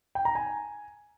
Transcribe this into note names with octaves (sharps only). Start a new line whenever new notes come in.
G5
A#5
G#5